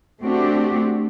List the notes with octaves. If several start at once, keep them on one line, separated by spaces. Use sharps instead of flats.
A3 C4 D4 F#4 G4